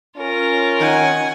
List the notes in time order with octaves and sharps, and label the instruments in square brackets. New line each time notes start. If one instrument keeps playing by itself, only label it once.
[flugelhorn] C#4 [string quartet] F4 A#4
[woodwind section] D#3 [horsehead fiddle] F#5 G#5